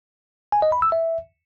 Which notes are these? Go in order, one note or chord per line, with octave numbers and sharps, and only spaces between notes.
G#5
D#5
B5
E6
E5